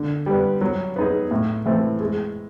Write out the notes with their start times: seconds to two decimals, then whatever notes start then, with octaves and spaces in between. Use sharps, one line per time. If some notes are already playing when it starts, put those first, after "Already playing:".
Already playing: D3
0.26 G3 B3
0.61 F#3
0.96 B3 D#4 G#4
1.31 A2
1.66 E3 A3 C4
2.00 G#3